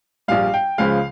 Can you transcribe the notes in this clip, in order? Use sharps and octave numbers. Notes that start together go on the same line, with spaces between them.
A#1 A#2 G3 F5
G5
C#2 C#3 F3 G#3 F5